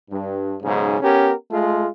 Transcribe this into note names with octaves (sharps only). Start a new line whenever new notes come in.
G2
B1 G#2 C#3
B3 C#4 G4 A#4
G#3 A3 F4